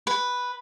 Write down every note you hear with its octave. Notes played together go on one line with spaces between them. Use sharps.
B4